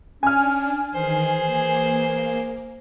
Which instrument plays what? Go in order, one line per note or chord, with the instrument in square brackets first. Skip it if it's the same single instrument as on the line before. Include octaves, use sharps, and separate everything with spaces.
[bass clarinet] C#4 [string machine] D4 [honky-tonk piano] G#5 F6
[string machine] D#3 [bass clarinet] E3 [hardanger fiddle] G#4 C5
[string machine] A#3